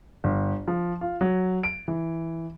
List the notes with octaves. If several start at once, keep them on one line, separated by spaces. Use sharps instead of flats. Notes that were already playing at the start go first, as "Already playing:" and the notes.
G1
F3
F4
F#3
D7
E3